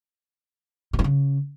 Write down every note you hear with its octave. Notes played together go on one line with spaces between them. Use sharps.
B2
G2
C#3